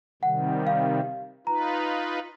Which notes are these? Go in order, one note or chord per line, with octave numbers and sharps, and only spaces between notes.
C3 D#3 G3 F#5
F5
D#4 F4 B4 A#5